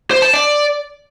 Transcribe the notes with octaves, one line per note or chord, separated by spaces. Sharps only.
C5
A5
D5